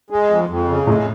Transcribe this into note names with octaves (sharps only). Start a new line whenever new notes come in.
G#3
F2
F2
C#3
A2 G#3